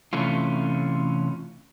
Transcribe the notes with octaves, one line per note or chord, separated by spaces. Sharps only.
C3 E3 A3 C#4 F4